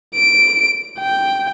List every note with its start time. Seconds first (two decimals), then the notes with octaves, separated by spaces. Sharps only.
0.15 D7
1.00 G5